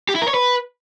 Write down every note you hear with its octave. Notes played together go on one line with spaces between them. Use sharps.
G4
E4
A#4
C#5
B4